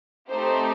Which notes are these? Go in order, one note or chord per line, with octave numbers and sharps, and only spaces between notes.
A3 C4 D#4 G4 C5